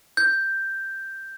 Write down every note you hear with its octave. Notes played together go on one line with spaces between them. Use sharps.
G6